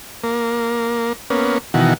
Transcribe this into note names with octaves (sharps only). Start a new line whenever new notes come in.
A#3
A#3 B3 C#4
B2 D#3 E3 F#4